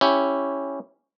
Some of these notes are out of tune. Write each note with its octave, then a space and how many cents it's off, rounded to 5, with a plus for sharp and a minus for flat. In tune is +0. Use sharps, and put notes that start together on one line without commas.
C#4 +0 E4 +0 G4 +0